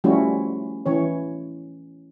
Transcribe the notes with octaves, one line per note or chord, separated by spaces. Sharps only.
F3 G3 A3 C#4 E4 F#4
E3 C#4 C#5